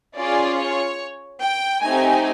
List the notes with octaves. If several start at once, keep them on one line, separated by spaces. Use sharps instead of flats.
C#4 F4 G#4 D5
C#5
G5
A3 C4 D#4 G4 G#5